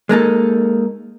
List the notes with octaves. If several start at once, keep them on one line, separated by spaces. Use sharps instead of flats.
G#3 A#3 D#4 A4